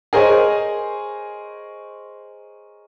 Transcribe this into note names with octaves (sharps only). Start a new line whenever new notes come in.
G#4 A#4 C5 C#5 D#5 G#5